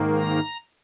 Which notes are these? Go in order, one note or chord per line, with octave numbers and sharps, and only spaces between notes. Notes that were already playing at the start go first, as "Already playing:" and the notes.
Already playing: G#2 D#3 A#3
A#5